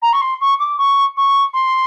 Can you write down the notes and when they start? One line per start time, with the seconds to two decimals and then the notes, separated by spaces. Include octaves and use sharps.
0.02 A#5
0.13 C#6
0.21 C6
0.41 C#6
0.59 D6
0.78 C#6
1.17 C#6
1.53 C6